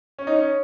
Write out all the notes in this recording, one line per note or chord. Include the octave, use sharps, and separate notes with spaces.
C#4
D#4
C#4